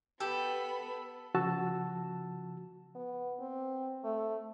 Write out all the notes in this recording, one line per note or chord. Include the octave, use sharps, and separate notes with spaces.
B3 G4 A4 B5
C#3 F3 F#4 A5 E6
B3
C4
A3